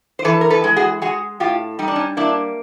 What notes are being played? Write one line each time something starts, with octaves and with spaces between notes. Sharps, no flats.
C5
E3 A4 B4
A#4
A4 B4
G#3
F#4 G#4
G#3 F#4 G#4
A2 F4 G4
G3 D#4
D4
C#4 D#4
A#3 D4 E4